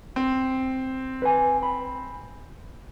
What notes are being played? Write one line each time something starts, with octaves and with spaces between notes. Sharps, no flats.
C4
B4 G#5
B5